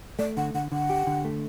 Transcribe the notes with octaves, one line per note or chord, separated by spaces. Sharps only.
A3 D5
D3 F#5
D3 F#5
D3 F#5
G4
D3
A3